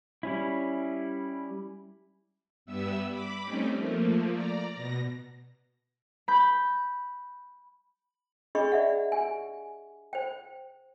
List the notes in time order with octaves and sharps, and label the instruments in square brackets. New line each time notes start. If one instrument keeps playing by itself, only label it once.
[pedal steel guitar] G3 C#4 E4
[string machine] G2 G3 B3 E5 E6
B5 D6 B6
G3 A3 C4 C#4 D#4
F3 A3 A#3
D5 A#5
B2 A#6
[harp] B5 G6
[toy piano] D4 G4 G#4 D#5 B5 C#6
D5 E5 F#5
G4 G#5
C5 G5